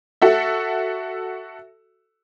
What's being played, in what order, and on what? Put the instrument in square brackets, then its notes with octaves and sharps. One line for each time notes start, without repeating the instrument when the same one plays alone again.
[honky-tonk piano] F#4 A4 E5